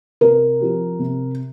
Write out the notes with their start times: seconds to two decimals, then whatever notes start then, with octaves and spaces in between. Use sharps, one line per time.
0.21 C3 A#4
0.61 F3 C4 G4
0.99 C3